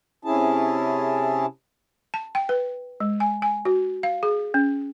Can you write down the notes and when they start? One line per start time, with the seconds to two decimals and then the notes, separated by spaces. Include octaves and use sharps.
0.25 C3 C#4 E4 G#4 A5
2.14 A5
2.35 G5
2.49 B4
3.00 G#3
3.20 G#5
3.42 G#5
3.65 F#4
4.03 F5
4.23 G#4
4.54 C#4